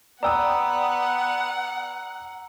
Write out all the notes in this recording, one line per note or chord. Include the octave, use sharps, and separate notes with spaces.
B3 D5 F#5 G5 A#5 D#6 E6